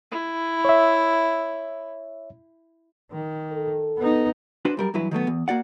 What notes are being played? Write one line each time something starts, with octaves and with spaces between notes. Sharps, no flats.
E4
C#5 E5
D#3
A4
B3 D#4
D4 F#4 B4 C5
F#2 G3 A#4
G2 E3 F#3 E4 B4
D#3 F#3 A3 B3
E2
A#3 F#4 D5 F#5